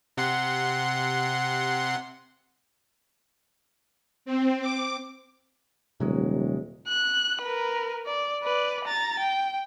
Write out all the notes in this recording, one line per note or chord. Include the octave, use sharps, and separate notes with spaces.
C3 F#5 C6
C4
D6
D#1 C3 F#3 G#3
F#6
A#4 B4
D5
B4 D5
A#5 A6
G5